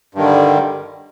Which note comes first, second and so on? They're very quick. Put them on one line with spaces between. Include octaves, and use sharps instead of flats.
G2 D#3 D3 G3